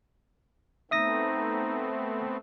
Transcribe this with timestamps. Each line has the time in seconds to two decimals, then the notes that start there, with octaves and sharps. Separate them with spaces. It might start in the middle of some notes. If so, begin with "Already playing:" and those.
0.91 A3 B3 C4 D#4 E5 D#6 A#6